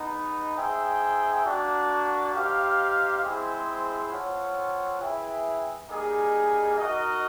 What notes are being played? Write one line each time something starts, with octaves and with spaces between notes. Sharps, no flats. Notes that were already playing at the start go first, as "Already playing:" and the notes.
Already playing: G#3 B3 D#4
D#4 G#4 C5 E5 G5
A#3 D4 F#4
D#4 G4 C5 F5
G#3 C4 E4 G#4 C5
C4 F4 A4 C#5 F#5
E4 G#4 B4 E5 G5
G3 A#3 D#4 G#4
D#4 F#4 A#4 D#5